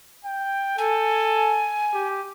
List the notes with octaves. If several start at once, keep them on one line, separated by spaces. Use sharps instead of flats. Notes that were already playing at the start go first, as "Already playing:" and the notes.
G5
A4 G#5
G4